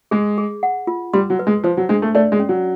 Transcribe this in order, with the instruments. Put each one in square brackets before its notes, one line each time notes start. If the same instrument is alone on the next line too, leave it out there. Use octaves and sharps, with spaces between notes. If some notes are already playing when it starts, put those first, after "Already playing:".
[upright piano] G#3 [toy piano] G#4
[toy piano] G#4
F#5
F4
[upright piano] G3 [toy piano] C6
[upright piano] F#3
[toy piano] B4
[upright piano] G#3
[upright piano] F3 [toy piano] C5
[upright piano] F#3
[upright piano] G#3 [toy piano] D4
[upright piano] A3
[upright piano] A3 [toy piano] D5
[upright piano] G#3
[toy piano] C#4
[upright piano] F#3